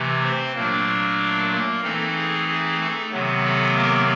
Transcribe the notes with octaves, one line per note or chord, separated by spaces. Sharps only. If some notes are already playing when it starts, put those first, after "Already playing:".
Already playing: C3 E3 A3
C4 C5
A#2 F#3 A3 A#3 D4 A#4
A#3 A#4
E3 A3 C4 D#4 A4
G#4
G#4
A3 A4
C3 D#3 F#3 B3
A3 A4
A#3 A#4